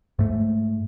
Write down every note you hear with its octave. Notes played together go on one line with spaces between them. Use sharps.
G#2 A3